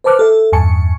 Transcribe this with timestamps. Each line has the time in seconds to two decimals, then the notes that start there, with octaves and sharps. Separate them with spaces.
0.04 B4 C5 A5 D6 F6 F#6
0.19 A4 E5
0.52 E2 G2 G#5 A5 C#6 C#7